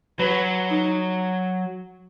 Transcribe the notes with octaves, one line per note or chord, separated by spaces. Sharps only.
F#3 B4
D#4